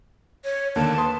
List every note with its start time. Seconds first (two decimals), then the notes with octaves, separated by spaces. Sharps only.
0.44 C#5
0.76 D#2 D3 A#3 A5
0.97 B4 C6 D#6